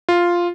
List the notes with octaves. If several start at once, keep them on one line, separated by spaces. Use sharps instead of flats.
F4